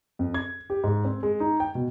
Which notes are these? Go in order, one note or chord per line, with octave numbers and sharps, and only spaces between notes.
F2
G#6
G4
G#2
C4
G#3
D#4
G5
B2